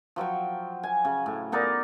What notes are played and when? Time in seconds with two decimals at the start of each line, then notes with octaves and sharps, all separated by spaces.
0.16 F3 F#3 G5 C#6
0.83 G#5
1.05 C#3
1.26 A2
1.52 B3 D#4 A#4 D5